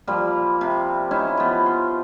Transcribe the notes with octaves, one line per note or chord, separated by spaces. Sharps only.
F3 G3 A#3
C3
C#4 D#4 E4
F3 B3
C6